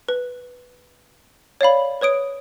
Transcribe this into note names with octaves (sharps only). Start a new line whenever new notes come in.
B4
C#5 D5 F5 B5
B4 C#5 D#6 D7